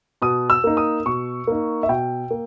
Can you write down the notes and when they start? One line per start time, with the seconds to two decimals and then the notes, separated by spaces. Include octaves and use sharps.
0.22 B2 D#6
0.50 E6
0.64 A#3 D#4
0.77 D#6
1.06 B2 C#6
1.47 A#3 D#4
1.83 E5
1.89 B2 G5
2.31 A#3